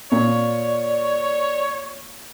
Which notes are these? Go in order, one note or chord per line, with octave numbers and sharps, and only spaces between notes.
A#2 C#5 D5